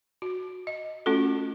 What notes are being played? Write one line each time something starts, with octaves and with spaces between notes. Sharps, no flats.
F#4
D#5
A3 C#4 F4 F#4 A4